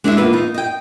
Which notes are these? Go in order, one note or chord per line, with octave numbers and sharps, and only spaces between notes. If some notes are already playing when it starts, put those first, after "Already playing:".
G#3 D4 E4 G#4 D#5 E5
E2 A#2 B4
D#4 F4
D#5 G5